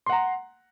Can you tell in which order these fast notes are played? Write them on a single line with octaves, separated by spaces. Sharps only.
C6 F#5 A#5